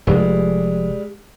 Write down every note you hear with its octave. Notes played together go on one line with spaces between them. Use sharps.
F1 G3 G#3